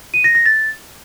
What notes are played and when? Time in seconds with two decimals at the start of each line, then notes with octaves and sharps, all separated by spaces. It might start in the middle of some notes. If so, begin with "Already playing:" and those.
0.14 D#7
0.24 A#6
0.35 A#6
0.46 A6